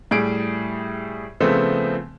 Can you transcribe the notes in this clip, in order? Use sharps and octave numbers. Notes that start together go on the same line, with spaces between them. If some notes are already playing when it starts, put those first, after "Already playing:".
A2 G3 G#4 D7
C#3 F3 A3 B3 C4